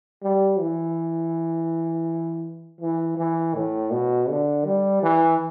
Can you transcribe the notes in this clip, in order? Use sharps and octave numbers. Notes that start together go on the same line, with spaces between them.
G3
E3
E3
E3
A2
B2
D3
G3
E3